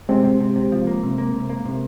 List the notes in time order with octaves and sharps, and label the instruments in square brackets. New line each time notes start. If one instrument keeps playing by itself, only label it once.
[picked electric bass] C3 [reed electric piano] G#3 C4
[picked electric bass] C3
C3
C3
F3
A#3
C3
A#3
C3
A#3
C3